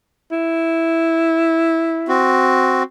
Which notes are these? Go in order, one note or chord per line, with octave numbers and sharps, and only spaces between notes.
E4
C4 F#4